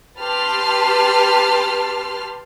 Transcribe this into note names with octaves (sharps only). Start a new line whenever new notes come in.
G4 B4 A5 C6 F6